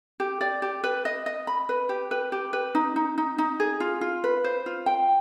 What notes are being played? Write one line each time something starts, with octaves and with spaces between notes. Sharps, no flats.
G4
D5
G4
B4
D#5
D#5
B5
B4
G4
B4
G4
B4
D#4
D#4
D#4
D#4
G#4
F4
F4
B4
C5
F4
G5